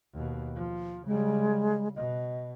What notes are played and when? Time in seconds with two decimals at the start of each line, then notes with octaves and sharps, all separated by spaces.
0.14 D#2 B2
0.55 F3
1.07 C#3 G3 G#3
1.96 B2 D#5